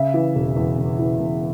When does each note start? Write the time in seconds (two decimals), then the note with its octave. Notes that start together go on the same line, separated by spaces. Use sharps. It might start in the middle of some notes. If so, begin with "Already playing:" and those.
Already playing: C#3 E5
0.14 E3
0.35 E1
0.56 E2
0.78 C#3
0.99 E3
1.19 E1